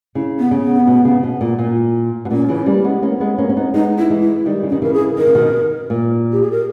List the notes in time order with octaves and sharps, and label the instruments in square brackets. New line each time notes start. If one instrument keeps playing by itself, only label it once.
[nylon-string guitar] C#3 [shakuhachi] E4
[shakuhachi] B3
[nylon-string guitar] C#3
[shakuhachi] B3
[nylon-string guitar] B2
C#3
B2
A#2
A#2
B2
[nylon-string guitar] A#2 [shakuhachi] C#4
[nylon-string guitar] C#3 E3
G3 A#3
G#3 B3
A#3 C#4
G#3 B3
A#3 C#4
C#4
B3 D#4
[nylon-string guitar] G#3 B3 [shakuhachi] D#4
[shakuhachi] E4
[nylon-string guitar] E3 G#3
[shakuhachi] E4
[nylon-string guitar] D#3 G3 [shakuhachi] D#4
[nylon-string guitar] C#3
[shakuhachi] C#4
[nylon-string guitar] D#3
[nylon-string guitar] C#3 E3 [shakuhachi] A#4
[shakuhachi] G#4
[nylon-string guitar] D#3 [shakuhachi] A#4
[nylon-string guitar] C#3
B2 D#3
A#2
[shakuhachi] G4
G#4
A#4